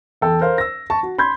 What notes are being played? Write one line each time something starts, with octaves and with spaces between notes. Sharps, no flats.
E2 A4 G5
A#4 C5 F5
E6 A#6
A5 C#6
F#4
B5 C6 G6 G#6